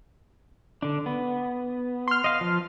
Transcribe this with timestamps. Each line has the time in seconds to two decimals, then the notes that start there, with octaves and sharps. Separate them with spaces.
0.82 D3 D4
1.06 B3
2.08 C6 F6
2.24 D#5 F5
2.41 F3